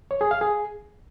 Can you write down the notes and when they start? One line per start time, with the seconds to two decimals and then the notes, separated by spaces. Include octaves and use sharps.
0.11 C#5
0.21 G#4
0.31 F5
0.41 G#4